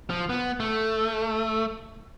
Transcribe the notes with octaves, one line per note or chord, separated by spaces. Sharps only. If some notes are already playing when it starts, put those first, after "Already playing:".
F3
B3
A3